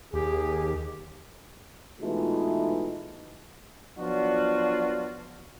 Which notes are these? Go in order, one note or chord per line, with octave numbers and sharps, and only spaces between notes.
D#2 G4 G#4
B2 E3 G#3 A3 D#4 F4
F3 F#3 B3 D4 F4 F#4